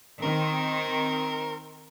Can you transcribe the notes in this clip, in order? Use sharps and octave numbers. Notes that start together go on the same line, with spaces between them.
D#3 C4 A#4